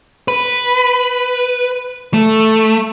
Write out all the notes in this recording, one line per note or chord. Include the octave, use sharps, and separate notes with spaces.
B4
A3